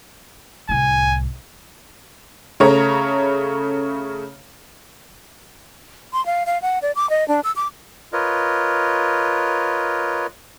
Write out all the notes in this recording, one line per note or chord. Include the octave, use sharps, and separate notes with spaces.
C2 A2 G#5
C#3 A3 C#5 A#5
C6
F5
F5
F#5
D5
D6
D#5
D4
E6
D6
F4 A#4 B4 C#5 D#5